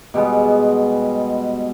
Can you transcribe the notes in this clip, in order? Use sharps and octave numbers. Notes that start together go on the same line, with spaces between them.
B2 G3 G#3 B3